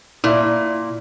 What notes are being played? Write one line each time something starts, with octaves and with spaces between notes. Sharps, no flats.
A#2 E4